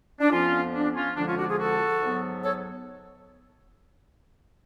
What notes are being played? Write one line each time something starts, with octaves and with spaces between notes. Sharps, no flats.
D4
F2 F3 B3 C#4 F4
D4
C#4 F4
F2 D3 F3 G#3 D4
C#4 F4
D4 F#4
F4 G#4
F#4 A4
G#2 F#3 B3
A4 C#5